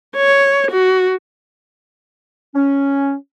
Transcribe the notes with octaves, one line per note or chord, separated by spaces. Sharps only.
C#5
F#4
C#4